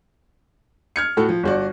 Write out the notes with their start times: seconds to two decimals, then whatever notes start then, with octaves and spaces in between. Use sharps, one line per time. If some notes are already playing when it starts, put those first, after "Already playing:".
0.96 F6 G#6 C#7
1.17 A2 F#4 A4
1.29 F3
1.43 G1 F#4 D5